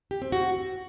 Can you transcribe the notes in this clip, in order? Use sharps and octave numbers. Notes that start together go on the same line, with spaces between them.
G4
C4
F#4